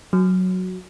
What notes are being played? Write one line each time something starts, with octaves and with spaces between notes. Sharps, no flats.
F#3